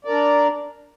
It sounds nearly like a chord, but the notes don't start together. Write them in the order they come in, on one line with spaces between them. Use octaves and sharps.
D5 A#4 D4